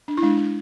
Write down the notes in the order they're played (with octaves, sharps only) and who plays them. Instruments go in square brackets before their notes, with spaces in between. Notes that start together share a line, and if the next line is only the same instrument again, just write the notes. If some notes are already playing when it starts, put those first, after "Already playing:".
[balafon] D4
E4
G#3 D4
D4